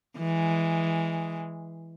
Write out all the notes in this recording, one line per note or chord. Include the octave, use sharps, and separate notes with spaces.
E3 G#3